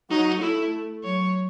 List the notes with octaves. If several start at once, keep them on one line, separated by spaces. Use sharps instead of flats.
F#3 D#4
A3 E4
F#3 C#5